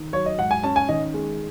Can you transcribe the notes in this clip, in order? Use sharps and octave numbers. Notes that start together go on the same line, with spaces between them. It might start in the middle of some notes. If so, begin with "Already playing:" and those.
Already playing: D#3
F#3 C#5
D#5
G#2 F#5
G#5
C#4 A5
G#5
D#3 D#5
G#3